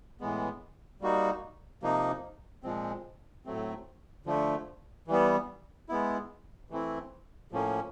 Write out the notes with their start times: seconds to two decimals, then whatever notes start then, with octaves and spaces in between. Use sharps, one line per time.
0.20 A2 E3 G#3 B3
1.01 G3 A#3 D#4 F#4
1.83 C3 F3 A#3 D#4
2.63 A#2 F3 G#3 C4
3.45 A2 F#3 A3 C4
4.26 D3 F3 A3
5.07 E3 G3 B3
5.89 G#3 B3 E4
6.70 E3 A3 C4 E4
7.51 A2 F3 A#3 C#4